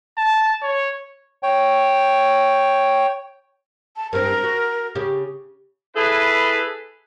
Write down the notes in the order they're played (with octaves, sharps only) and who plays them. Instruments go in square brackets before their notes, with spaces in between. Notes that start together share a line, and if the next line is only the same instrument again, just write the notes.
[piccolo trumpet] A5
C#5
[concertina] C#5 G5
[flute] A5
[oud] G2 C4 [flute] A#4
[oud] F#4
C#3 G4
[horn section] E4 G#4 A4 B4